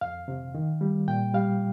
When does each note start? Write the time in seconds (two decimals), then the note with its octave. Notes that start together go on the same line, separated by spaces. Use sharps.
0.01 F2 F5
0.28 C3
0.55 D#3
0.81 G3
1.08 A#2 G5
1.34 G3 F5